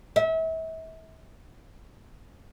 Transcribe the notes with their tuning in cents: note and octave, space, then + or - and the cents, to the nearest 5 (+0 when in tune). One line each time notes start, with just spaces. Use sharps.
E5 -35